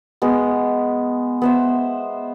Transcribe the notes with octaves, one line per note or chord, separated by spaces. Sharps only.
G#3 B3
B3 C5 E5